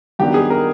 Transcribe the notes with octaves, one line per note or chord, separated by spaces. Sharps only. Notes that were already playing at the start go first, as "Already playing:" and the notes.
G2 D#3 F#3 B3 D4 G4
G#4
A#4